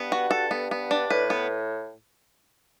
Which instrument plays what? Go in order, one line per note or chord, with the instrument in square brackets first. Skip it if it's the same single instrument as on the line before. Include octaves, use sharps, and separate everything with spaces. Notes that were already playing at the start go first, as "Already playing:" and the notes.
Already playing: [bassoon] G2 [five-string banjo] B3
[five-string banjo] F#4
A4
B3
B3
D4
[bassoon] A2 [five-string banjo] B4
[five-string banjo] B3